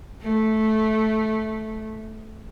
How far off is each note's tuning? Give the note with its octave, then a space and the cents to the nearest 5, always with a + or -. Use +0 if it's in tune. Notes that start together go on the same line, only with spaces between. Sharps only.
A3 -10